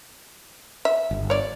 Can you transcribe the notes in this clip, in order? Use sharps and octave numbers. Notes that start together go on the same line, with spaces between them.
E5
G1
C#5 D5